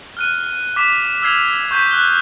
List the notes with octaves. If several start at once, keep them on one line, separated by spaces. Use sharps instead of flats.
F6 F#6 D#7
D6 B6 F7
E6 F6 G#6 C7 F7
C#6 G6 B6
F#6 G7